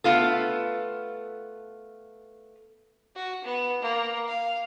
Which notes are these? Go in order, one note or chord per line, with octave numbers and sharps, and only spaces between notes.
A3 B3 F4 A4
F#4
B3
A#3
F5